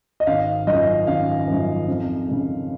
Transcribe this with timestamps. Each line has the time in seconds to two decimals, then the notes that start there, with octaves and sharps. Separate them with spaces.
0.20 D#5
0.27 G#1 F5
0.67 F#2 F3 D#5
1.07 G#1 F5
1.47 F#2 F3
1.87 F2
2.28 C#3 G#3